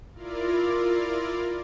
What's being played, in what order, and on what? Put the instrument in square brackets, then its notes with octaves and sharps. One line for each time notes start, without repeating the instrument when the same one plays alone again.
[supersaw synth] E4 F4 A#4 D5 F5